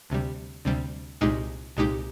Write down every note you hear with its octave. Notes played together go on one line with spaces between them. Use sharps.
D2 C3 G3
D2 C3 G3
C2 A#2 G#3 D#4 G4
C2 A#2 G#3 D#4 G4